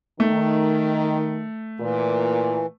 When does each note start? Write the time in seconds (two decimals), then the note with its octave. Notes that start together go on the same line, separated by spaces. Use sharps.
0.20 D#3 A3
1.80 A#2 E3